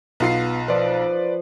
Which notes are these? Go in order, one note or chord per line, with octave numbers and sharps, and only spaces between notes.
B1 B3 F4 C7
F3 B4 D5